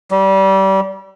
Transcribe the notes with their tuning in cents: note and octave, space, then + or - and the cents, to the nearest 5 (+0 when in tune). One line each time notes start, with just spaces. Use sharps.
G3 -25